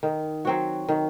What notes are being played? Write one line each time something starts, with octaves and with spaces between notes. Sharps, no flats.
D#3
F#3 C4 F#4
D#3